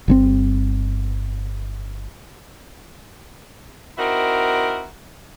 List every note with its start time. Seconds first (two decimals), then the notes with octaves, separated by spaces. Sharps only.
0.08 G1 C#3 C4
3.97 C4 D#4 E4 F#4 A#4